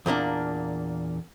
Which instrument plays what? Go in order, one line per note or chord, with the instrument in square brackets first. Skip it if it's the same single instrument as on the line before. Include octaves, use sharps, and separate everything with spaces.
[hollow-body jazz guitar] E2 A#2 A#3 D4